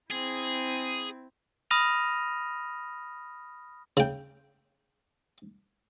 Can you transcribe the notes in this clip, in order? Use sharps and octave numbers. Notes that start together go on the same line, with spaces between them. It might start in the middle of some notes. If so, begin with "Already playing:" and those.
C4 E4 G#4
B5 D#6 F6 A#6 D#7 F7
C#3 G5